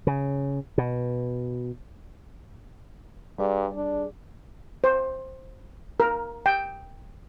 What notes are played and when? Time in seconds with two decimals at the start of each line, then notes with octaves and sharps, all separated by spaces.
0.07 C#3
0.78 B2
3.38 G2 G3 G#4 D5
3.76 D4
4.84 C5
6.00 A#4
6.46 G5